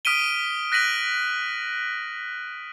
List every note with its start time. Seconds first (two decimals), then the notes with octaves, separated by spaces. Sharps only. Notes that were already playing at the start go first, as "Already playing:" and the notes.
0.05 D#6 F6 B6 D7 D#7 G7
0.72 F#6 A#6 B6 D#7 F#7